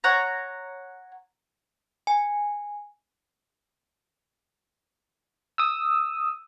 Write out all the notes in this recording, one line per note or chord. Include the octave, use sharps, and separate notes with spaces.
C#5 F#5 A#5
G#5
D#6 E6